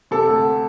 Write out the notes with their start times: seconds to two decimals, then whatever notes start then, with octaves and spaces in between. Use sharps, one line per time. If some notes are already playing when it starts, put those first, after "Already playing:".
0.11 C3 A4
0.28 D2